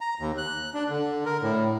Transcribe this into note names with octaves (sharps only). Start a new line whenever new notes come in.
A#5
D#2
F#6
D4
D3
A#4
A2